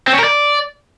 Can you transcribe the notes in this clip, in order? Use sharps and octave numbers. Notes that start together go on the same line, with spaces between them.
C4
C#4
A#4
D5